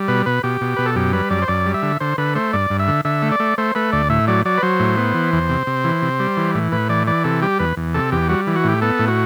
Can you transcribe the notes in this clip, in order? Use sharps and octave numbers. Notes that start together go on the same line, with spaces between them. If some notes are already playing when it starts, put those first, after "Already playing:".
Already playing: G3
B2 B4
B2 B4
B2 G4
B2
B2 B4
A4
F#2 G4
G3 B4
F#2 D5
C5
F#2 D5
G3
E5
D3
D3 C5
D3 B4
A3 C5
G2 D5
G2
E5
D3
D3 E5
A3
D5
A3
A3 C5
A3 B4
D2 D5
A2 E5
F#3 D5
F#3 D5
B4
F#3 C5
A2
B3
E3
E2
C3
C3
E3
C3
G3
E3
A2
A2 B4
E3 D5
E3 D5
C3 A4
G3 G4
E2 B4
E2
C3 A4
E2 G4
G3 F#4
E3
F#4
A2 G4
B3 A4
A2
F#4